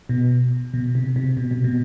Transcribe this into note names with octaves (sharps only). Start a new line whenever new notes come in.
B2
B2
C3
C3
B2
C3
B2